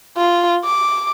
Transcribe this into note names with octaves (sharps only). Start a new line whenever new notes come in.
F4
D6